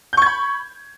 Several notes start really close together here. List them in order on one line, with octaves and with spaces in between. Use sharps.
G6 C#6 G#6 B5